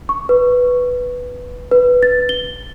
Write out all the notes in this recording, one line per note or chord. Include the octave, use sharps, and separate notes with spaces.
C#6
B4
B4
A6
G7